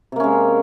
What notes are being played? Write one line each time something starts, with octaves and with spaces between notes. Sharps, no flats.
C3 G#3 A#3 C#4